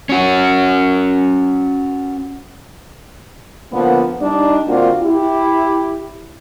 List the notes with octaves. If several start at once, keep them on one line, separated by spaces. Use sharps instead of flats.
C#4 F#4
D3 F3 A#3 B3
G3 D4 D#4
D3 A#3 C4 D4 F4 F#4
E4 G4